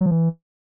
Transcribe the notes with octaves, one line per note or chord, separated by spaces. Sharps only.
F#3
F3
E3